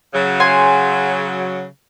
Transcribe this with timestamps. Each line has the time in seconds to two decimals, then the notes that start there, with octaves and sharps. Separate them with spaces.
0.13 C#3 F#3
0.40 G#5 C6